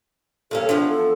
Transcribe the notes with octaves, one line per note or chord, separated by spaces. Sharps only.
G2 A#3 C#4 A4
E2 F3 D4
A4